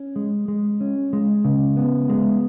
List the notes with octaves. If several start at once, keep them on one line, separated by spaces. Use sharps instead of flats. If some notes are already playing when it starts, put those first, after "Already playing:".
Already playing: C#4
G#3
G#3
C#4
G#3
C#3
B3
G#3